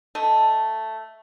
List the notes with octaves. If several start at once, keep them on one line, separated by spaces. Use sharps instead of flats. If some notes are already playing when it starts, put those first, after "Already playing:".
A3 A4 D#5